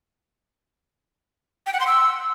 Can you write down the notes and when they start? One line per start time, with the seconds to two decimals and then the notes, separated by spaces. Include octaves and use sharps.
1.66 G5
1.73 F#5
1.80 C6
1.87 E6